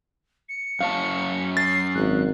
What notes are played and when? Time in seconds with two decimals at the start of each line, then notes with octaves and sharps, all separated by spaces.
0.49 C#7
0.81 F#2 C#5 F5 A5
1.57 A6 C7
1.95 G#1 F#6